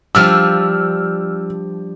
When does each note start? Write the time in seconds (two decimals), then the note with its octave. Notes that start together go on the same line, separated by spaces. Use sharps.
0.15 F3 G3 D4 E6 F6